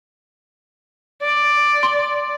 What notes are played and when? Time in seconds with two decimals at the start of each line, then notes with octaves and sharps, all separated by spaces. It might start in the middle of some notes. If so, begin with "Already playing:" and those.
1.22 D5
1.83 C6